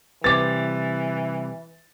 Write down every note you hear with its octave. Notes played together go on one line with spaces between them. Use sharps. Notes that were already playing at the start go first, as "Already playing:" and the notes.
C3 E3 G3 B4 D6 A6